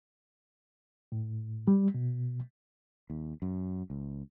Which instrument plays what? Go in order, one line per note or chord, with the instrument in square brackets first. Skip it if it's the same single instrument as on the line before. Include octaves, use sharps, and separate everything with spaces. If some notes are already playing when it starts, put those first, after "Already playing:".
[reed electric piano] A2
G3
B2
[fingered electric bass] D#2
F#2
C#2